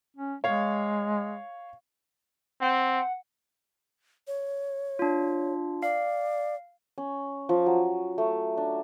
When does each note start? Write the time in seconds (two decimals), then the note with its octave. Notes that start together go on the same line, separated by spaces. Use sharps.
0.17 C#4
0.44 G#3 C#5 F5
2.61 C4 F#5
4.27 C#5
4.99 D4 F4
5.83 D5 F5
6.98 C#4
7.49 F3
7.66 F#3
8.18 A3
8.57 D4